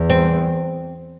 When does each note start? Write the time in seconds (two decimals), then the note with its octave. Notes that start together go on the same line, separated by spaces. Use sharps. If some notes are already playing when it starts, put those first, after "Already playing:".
Already playing: E2
0.10 C4